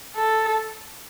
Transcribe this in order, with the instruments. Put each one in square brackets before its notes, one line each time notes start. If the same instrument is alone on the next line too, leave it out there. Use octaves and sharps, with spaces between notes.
[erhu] A4